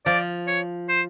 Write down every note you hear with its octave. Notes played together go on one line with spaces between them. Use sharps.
F3 D5
C#5
C5